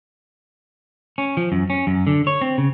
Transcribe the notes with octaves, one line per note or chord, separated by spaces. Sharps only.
C#4
F3
F#2
C#4
F#2
D3
C#5
C4
C#3